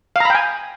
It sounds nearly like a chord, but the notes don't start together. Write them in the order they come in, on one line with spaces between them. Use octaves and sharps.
F5 A#5 B5 G5 G#5